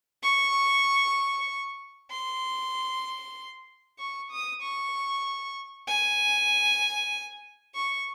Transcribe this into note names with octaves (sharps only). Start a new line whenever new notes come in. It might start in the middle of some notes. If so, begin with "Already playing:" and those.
C#6
C6
C#6
D#6
C#6
G#5
C#6